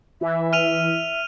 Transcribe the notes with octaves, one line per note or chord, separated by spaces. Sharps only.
E3 E5
F6 D#7 F7